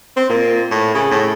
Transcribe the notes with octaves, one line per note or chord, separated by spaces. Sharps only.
C4
A#2
A2
C#3
A2